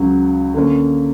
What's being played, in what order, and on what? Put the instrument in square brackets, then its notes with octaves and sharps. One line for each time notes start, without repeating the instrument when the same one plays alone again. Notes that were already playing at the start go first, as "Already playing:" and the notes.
Already playing: [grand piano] C#2 C#3 F#3
D3 A#3 C#4